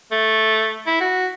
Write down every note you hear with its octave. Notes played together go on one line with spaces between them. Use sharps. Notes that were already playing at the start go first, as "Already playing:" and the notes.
A3
E4
F#4